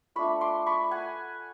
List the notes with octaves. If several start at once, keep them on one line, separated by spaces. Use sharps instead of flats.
A3 D4 F4 B5 C#6
C6 D6
B5 C#6
F#5 G#5